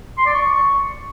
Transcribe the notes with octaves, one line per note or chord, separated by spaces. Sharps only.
C6
D5
C#6